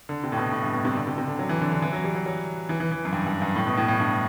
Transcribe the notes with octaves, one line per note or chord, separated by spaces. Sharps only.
D3
C3
A2
B2
A2
G2
B2
C3
D3
C3
C3
D3
F#3
E3
D3
D3
E3
F#3
G3
F#3
F#3
E3
E3
E3
F#2
G2
G2
G2
A2
B2
A2
A2
G2